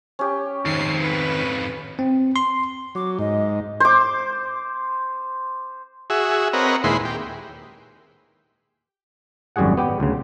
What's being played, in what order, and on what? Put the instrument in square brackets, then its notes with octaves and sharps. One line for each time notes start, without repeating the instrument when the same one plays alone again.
[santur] C#4 G4
[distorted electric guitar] F2 G#2 [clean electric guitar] D#3 [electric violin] C7
[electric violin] B4
[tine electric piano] C4
C6
[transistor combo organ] F#3 [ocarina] D6
[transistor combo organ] G#2 [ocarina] D#5
[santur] C5 D6
[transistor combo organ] F#4 G#4 E5
C4 A#4 B4 C#5 D#5 F#5
D#2 A#2 G#3 E4 B4 C6
G4
[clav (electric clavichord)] G#1 F#2 G3 F#4 G#4 F#5
B3 G4 G5
D2 C#3